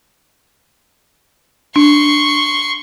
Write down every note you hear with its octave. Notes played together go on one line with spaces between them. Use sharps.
D4 C6 C#6